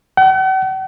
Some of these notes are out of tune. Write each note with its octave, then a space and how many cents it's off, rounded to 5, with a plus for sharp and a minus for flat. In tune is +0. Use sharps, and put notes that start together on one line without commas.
F#5 +45